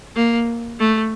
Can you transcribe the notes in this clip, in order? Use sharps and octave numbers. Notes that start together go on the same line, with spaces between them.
A#3
A3